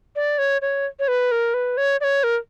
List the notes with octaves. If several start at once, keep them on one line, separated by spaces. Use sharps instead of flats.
D5
C#5
C#5
C#5
B4
A#4
B4
C#5
D5
C#5
A#4